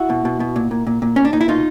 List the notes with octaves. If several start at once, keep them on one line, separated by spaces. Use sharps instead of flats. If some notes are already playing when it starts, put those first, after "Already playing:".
Already playing: E4 F#4
B2
B2
B2
A#2
A#2
A#2
A#2
A#2 C#4
D4
A#2 D#4
E4
B2 D#4 F4